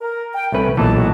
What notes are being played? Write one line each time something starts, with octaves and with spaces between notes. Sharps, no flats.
A#4
G5
C2 A3 C#4 B4
B1 A#2 E3 A5
G2 F#4